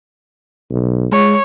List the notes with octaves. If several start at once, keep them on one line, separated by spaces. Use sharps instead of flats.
B1
G#3 C#5